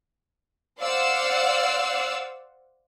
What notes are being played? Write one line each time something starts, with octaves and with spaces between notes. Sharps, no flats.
C5 D5 F5 F#5 E6